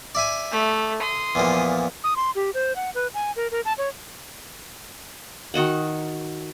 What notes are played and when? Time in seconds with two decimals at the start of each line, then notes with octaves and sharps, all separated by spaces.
0.15 D5 E5 G#5
0.51 A3
1.00 C6 D#6
1.35 E2 A#2 F3
2.04 D#6
2.16 C6
2.35 G4
2.54 C5
2.76 F#5
2.95 B4
3.14 G#5
3.36 A#4
3.51 A#4
3.65 A5
3.78 C#5
5.54 D#3 F#4 D#5 F#5